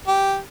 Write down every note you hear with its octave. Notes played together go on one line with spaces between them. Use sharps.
G4